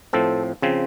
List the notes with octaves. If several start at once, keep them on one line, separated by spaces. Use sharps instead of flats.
A2 F3 C4 A4
C#3 F3 C4